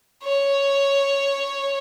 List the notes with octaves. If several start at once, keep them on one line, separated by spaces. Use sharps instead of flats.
C#5